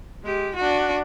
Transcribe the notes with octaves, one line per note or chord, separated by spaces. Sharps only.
G#3 G4
D4 F#4